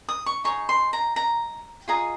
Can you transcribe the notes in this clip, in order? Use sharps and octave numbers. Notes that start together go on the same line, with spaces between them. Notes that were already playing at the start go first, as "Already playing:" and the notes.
D#6
C#6
D#4 G#4 C#5 C#6
C6
A#5
A#5
F4 G#4 D#5 A#5